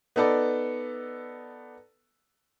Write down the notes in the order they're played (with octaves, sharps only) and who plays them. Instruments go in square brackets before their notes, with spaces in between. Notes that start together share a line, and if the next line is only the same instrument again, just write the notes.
[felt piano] B3 D#4 A4 B4 D5